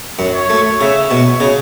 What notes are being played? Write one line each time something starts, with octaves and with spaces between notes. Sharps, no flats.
F#2
C#5
A3
C#3 E5
B2 C#5
C#3